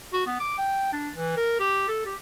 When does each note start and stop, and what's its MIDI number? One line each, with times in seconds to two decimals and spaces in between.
0.13 0.26 66
0.27 0.37 59
0.40 0.58 86
0.58 0.90 79
0.93 1.09 62
1.15 1.35 52
1.37 1.60 70
1.60 1.84 67
1.88 2.04 69
2.06 2.15 67